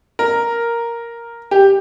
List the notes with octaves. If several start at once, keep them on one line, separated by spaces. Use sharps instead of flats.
A#4
G4